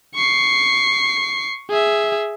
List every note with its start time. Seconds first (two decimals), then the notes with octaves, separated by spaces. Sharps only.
0.15 C#6 C7
1.70 G#4 E5